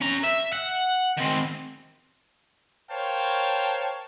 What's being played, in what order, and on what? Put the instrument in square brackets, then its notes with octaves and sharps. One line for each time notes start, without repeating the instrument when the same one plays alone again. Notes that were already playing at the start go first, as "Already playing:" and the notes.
[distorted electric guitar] C#4 A#5
E5
F#5
D#3 C4
[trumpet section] A#4 C5 C#5 F5 G5 A5